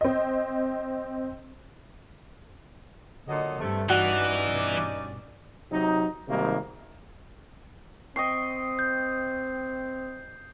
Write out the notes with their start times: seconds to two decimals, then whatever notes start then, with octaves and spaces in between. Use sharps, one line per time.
0.01 C4 D#5
3.28 A#2 D3 F#3 D#5
3.60 G2 C3 A3
3.90 E3 C#4 D#4 F#4 D5
4.48 G2 B2
5.71 C3 F#3 D#4
6.29 G#1 C3 D#3 G3 A#3
8.16 C4 D#5 G5 C#6 C7
8.79 G6